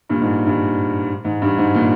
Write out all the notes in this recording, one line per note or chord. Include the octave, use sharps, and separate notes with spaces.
G2 A#2
G#2
G2
G#2
G2
G#2
A#2